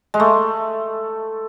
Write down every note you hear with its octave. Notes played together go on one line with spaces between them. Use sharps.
G#3
A3